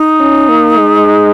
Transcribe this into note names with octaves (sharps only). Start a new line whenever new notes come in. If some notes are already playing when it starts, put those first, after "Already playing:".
Already playing: D#4
C#4
A#3
G#3